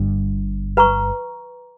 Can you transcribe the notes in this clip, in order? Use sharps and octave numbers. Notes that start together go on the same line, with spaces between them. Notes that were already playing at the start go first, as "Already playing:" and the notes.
Already playing: G1 G2
B4 F#5 A#5 C#6